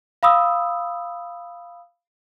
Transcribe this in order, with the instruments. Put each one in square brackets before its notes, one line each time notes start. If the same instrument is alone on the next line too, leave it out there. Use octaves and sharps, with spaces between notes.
[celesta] F5 B5 D#6 E6